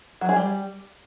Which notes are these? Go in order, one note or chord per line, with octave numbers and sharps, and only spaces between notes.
F#3
G#4
G3